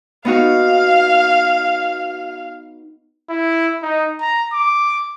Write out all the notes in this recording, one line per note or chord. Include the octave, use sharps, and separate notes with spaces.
B3 D#4 F#4 F5
E4
D#4
A#5
D6